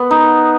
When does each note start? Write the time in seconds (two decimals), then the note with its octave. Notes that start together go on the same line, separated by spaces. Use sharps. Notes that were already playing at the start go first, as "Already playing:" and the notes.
Already playing: B3
0.11 D#4